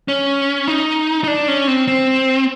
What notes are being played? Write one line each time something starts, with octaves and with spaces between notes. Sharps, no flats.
C#4
D#4
D#4
D4
C#4
C4
C4